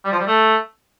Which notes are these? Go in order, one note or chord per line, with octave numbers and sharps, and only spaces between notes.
G3
F3
G3
A3